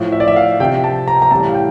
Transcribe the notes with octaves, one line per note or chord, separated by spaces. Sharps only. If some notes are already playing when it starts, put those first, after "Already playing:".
Already playing: A2 F3
E5
D5
E5
F5
C3 F3 G5
A5
A#5
A#5
A2 E3 G3 A5
F5
G5